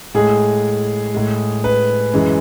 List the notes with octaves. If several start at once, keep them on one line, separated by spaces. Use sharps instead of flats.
A2 G#3 G#4
A2 G#3
B4
F#2 E3 G#3